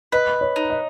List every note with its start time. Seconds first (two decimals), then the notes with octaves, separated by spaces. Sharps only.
0.12 B4 D#5
0.41 C#5
0.56 D#4
0.70 D#5